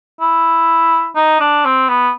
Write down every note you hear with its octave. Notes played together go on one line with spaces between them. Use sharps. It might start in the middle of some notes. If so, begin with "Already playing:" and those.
E4
D#4
D4
C4
B3